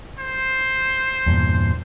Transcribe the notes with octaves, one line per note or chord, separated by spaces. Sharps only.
C5
E2 G2 A#2